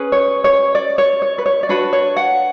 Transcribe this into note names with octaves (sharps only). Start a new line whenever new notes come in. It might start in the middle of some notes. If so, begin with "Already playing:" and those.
Already playing: C#4 G#4 B4
C#5
C#5
D5
C#5
C#5
B4
C#5
D5
D4 F#4 B4 C#5
C#5
F#5